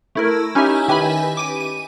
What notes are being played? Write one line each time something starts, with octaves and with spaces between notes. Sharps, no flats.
A3 E4 A#4
C#4 D#4 E4 G4 E5 G#5
D#3 G4 B4 E5 G#5 B5
D6 D#7
D#7